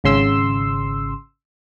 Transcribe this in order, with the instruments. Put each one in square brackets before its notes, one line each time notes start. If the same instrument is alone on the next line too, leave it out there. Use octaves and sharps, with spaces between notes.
[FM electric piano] G#1 C#3 C6 E6